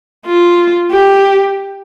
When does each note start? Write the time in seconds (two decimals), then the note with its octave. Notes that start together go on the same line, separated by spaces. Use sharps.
0.26 F4
0.91 G4